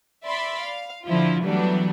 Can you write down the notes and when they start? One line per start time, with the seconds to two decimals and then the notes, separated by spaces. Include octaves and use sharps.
0.25 D5 E5 B5 C6
0.63 F5
1.05 D3 F3 E4 F4
1.42 E3 F#3 G3 A3 B3 D4